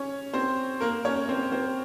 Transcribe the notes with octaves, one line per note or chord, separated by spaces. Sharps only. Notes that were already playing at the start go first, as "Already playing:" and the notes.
Already playing: C#4 C#5
C4 C5
A#3 A#4
C#4 C#5
C4 C5
C4 C5